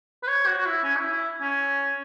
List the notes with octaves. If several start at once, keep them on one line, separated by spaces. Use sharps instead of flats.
B4
C#5
F#4
F#4
E4
C#4
E4
E4
C#4